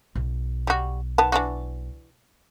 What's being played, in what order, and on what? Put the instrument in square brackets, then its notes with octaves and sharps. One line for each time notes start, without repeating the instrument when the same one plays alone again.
[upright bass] B1
[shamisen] G3 F#4
D#3 B3 A5
E3 D4 F#4